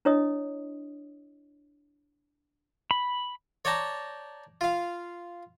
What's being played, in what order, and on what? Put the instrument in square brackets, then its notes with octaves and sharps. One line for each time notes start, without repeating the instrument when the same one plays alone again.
[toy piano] D4 E4 C#5 D#5 D#6
[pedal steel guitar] B5
[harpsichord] C#5 D5 G5 A5 A#5
F4 F5